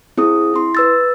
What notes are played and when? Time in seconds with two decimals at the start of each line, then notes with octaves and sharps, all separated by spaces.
0.18 C4 E4 G#4 D#6
0.54 E4 C6
0.75 B4 E6 A6